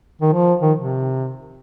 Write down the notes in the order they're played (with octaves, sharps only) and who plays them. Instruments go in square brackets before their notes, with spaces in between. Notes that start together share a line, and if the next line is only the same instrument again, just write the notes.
[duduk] D#3
F3
D#3
C3